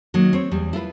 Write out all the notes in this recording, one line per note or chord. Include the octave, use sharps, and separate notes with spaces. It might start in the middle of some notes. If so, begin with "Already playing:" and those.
D#3 F#3 G#3 A#3
C4 C#5
E2 G3
E4 F4 A#4 B4